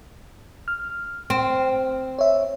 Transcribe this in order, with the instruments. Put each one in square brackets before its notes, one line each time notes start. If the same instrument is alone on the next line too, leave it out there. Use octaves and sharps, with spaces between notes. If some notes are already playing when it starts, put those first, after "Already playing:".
[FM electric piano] F6
[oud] C4
[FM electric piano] C#5 E5